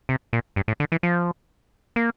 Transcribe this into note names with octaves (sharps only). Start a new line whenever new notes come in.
C3
A#2
G2
A2
D3
E3
F3
A#3